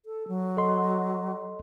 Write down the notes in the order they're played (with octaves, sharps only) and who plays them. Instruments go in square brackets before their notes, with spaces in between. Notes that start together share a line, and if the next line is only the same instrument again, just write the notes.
[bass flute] A4
F#3
[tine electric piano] A4 D#5 C6